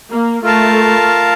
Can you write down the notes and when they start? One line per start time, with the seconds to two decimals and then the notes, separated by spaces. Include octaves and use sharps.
0.11 A#3
0.43 A3 F4 A#4 F5 A5